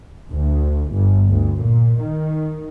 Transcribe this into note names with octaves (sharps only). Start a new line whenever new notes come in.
D2
G1
D2
A#2
D#3